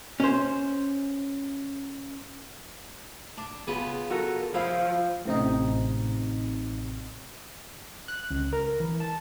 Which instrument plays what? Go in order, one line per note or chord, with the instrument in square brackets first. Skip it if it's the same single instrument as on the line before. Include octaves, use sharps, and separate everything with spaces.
[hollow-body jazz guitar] C#4 C5
[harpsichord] D4
C#3 B3 F4
[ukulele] F#4 A4 A#4
[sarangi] F3 [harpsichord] E4 [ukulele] G#4 C5 F5
[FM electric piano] A1 C3 D#4
[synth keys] F#6
C#2
A#4
E3
A5